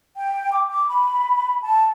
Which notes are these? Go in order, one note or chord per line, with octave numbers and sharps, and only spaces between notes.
G5
D6
D6
B5
A5